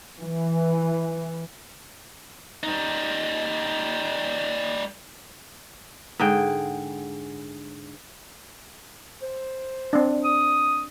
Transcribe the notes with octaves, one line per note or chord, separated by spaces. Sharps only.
E3
G3 D#4
G#2 D3 G#4 G5
C5
C4 D4
D#6